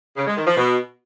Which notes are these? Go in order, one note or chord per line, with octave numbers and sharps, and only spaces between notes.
C#3
G#3
D#3
F3
B2